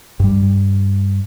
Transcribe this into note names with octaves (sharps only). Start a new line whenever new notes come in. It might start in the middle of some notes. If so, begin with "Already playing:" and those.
G2 G3